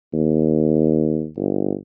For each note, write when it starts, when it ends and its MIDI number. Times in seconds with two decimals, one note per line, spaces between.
0.13 1.27 39
1.36 1.73 31